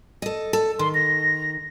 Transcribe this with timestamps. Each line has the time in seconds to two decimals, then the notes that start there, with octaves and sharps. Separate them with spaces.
0.22 A4 D#5
0.53 A4
0.79 D#3 C6
0.94 A#6